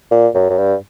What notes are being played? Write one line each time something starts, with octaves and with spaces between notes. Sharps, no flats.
A#2
F#2
F#2
G2